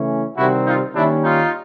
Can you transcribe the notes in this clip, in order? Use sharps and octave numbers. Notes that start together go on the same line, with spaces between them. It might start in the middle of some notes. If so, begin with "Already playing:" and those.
Already playing: C#3 E3 A3 C#4
C3 D#3 G3 C4 E4 F#4
D#4 F4
D#3 G3 A#3 C#4 D4 E4
D#4 F4